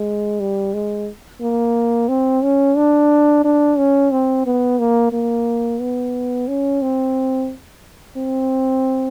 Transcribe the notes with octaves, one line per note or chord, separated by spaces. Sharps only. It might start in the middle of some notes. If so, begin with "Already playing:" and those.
Already playing: G#3
G3
G#3
A#3
C4
C#4
D4
D4
C#4
C4
B3
A#3
A#3
B3
C#4
C4
C4